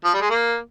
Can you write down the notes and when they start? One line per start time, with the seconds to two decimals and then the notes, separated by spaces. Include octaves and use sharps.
0.04 F3
0.14 G3
0.21 G#3
0.30 A#3